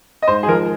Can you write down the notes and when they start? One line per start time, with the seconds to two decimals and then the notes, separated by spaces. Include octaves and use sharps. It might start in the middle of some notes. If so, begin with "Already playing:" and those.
0.22 D#5
0.27 G#2 C5
0.43 G#4
0.48 F3 A#4